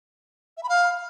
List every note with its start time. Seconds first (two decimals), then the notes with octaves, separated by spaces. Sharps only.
0.57 E5
0.63 B5
0.69 F5